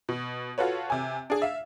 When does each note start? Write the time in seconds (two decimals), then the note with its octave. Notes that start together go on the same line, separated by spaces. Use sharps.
0.09 B2
0.58 F4 F#4 A4 B4 C#5
0.90 C3 G#5
1.30 D4 G#4
1.42 E5 F5